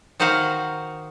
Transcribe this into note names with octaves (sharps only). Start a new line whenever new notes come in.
D#3 D#4 F#4 C5 F5